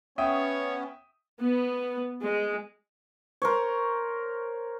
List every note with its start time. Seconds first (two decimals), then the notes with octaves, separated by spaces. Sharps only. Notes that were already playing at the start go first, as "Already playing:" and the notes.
0.18 B3 C#4 C#5 E5 G5 D#6
1.42 B3
2.22 G#3
3.42 A#4 C5 C#5